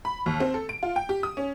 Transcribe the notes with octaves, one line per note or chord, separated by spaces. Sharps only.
B5
D#2
C4
A4
D7
F4
G5
G4
D#6
C#4